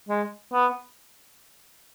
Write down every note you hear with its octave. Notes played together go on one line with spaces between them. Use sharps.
G#3
B3